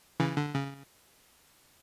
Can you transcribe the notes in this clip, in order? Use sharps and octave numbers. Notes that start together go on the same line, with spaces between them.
C#3 E3
D3
C#3